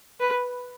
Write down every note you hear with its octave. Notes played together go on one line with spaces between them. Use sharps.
B4